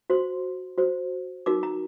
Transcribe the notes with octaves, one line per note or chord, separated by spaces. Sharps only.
F#4 C5 C6
F#4 C5
D#4 F#4 A#4 D6
A#5